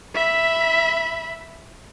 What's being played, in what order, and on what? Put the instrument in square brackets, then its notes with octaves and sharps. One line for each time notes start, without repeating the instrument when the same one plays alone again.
[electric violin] E5 B5